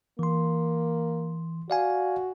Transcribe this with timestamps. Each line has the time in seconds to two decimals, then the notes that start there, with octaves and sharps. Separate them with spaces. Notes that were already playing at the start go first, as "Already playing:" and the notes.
0.19 E3 A#3 C6
1.70 F#4 D5 F5 G#5